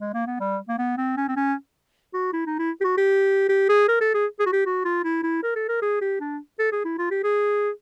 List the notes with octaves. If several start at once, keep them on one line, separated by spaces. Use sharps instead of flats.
G#3
A#3
B3
G3
A#3
B3
C4
C#4
C4
C#4
F#4
E4
D#4
E4
G4
F#4
G4
G4
G#4
A#4
A4
G#4
G#4
F#4
G4
F#4
F4
E4
E4
A#4
A4
A#4
G#4
G4
D4
A4
G#4
E4
F4
G4
G#4